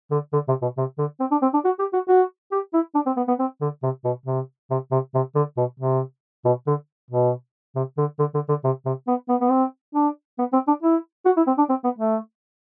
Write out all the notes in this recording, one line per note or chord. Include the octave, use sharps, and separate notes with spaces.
D3
D3
C3
B2
C3
D3
C4
D4
C4
D4
F#4
G4
F#4
F#4
G4
E4
D4
C4
B3
B3
C4
D3
C3
B2
C3
C3
C3
C3
D3
B2
C3
B2
D3
B2
C3
D3
D3
D3
D3
C3
C3
B3
B3
B3
C4
D4
B3
C4
D4
E4
F#4
E4
C4
D4
C4
B3
A3